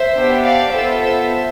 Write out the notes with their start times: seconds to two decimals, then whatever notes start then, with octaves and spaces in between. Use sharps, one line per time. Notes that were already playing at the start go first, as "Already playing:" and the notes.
Already playing: C5 E5
0.14 B3 D4 G4
0.43 D5 F5
0.72 B3 F4 A4 C5 E5
1.01 C5 E5